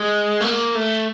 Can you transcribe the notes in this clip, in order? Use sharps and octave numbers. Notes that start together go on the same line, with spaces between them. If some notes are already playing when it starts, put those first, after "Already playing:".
Already playing: G#3
A3
A#3
A3